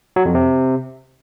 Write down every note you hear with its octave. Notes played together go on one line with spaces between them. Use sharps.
F#3
F2
C3